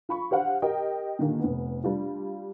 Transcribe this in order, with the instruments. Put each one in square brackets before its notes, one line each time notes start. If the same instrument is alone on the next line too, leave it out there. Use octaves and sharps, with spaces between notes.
[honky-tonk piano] F4 B5 C#6
G4 C5 F5 F#5
G4 A#4 D#5 G5
A#2 D3 D#3 A#3
F1 B3
G3 D4 F4